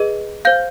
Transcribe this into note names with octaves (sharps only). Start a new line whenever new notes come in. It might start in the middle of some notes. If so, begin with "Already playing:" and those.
Already playing: G#4 B4 D#5
C5 F5 G6